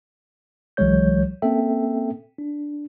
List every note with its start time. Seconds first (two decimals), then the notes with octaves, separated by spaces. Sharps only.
0.77 C2 E3 F#3 G#3 C#5 G6
1.42 A#3 C4 C#4 A4 E5 G5
2.38 D4